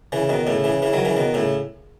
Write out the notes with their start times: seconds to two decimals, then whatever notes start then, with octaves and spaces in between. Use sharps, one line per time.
0.12 C#3 E3
0.29 B2 D#3
0.47 A2 C#3
0.64 C#3 E3
0.82 C#3 E3
0.93 D#3 F#3
1.05 C#3 E3
1.17 B2 D#3
1.34 A2 C#3